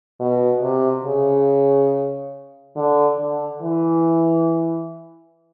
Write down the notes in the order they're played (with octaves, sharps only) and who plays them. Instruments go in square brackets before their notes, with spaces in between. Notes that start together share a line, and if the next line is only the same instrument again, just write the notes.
[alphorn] B2
C3
C#3
D3
D3
E3